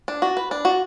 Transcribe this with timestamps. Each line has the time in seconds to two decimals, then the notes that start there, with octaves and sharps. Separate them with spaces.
0.08 D4
0.22 F#4
0.37 B4
0.51 D4
0.65 F#4